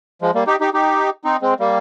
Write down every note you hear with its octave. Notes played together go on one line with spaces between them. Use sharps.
F3 G#3
G3 A#3
D#4 G4
D#4 G4
D#4 G4
C4 D#4
G#3 C4
G3 A#3